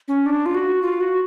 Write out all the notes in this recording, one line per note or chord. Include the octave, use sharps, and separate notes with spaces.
C#4
D4
F4
F#4
F4
F#4